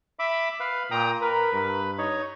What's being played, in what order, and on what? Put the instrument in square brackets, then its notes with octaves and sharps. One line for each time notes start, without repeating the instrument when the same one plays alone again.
[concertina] E5 B5 D6
B4 F5
[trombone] A#2 [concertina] G5 A#5 D#6
[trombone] A#4 [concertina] B4
[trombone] G2
[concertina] D#4 C#5